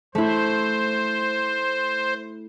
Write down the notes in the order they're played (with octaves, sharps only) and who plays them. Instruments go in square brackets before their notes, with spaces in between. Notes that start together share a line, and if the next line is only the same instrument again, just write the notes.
[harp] A3 E4 [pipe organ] C5